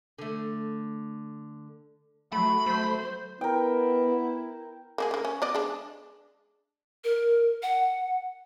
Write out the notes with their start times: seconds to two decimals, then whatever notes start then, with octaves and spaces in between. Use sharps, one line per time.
0.18 D3 A3
2.32 F#3 A3 B5
2.66 A3 C5
3.41 B3 E4 A#4 G5
4.98 A#3 F#4 G#4
5.11 C#3 A#3
5.25 C#4
5.42 B3 D5 D#5
5.55 G#3 D4
7.04 A#4
7.62 F#5